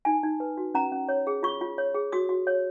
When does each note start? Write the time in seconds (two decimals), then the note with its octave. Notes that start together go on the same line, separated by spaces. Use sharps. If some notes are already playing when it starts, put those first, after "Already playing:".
0.05 D#4 G#5
0.23 D#4
0.40 B4
0.57 F#4
0.74 C#4 A#5
0.92 C#4
1.09 C#5
1.27 G#4
1.43 F4 C#6
1.61 F4
1.78 C#5
1.94 G#4
2.12 F#4 D#6
2.29 F#4
2.47 C#5